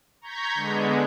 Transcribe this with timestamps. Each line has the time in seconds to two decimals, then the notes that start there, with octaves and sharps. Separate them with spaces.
0.21 A#5 C#6 G6 G#6 B6
0.55 D3 G#3 B3